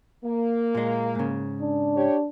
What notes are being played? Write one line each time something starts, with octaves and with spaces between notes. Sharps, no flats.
A#3
A#2 G#3
G#2 C#3
D4
G4 C#5